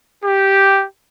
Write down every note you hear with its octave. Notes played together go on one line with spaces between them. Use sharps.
G4